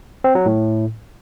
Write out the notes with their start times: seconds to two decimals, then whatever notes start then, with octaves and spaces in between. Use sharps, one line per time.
0.24 C4
0.35 F#3
0.46 A2